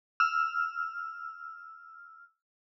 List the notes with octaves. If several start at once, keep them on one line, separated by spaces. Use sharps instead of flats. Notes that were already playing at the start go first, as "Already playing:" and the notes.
E6 F6